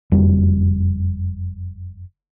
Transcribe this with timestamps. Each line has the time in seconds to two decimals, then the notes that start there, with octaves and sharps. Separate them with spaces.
0.12 F#1 F2 G3